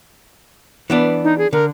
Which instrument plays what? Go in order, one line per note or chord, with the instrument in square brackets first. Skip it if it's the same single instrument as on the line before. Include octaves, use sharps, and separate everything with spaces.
[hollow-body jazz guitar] E3 B3 D4
[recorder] D#4
G#4
[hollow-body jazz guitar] D3 [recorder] A#4